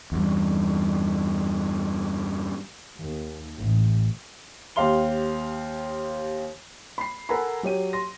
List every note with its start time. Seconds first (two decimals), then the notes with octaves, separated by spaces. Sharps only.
0.12 E2 G2
2.96 D#2
3.57 A1
4.76 D#2 G4 F5 C6 G7
6.98 B5 C7
7.29 A4 A#4 F#5 G#5 A#5 B5
7.63 F#3 G4 C#5 D#7
7.93 C6 A#6